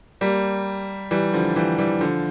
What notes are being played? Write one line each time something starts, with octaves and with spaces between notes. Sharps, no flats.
G3 A#3
E3 G3
D3 F3
E3 G3
E3 G3
D3 F3